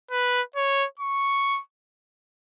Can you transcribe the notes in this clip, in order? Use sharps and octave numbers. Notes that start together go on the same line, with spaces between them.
B4
C#5
C#6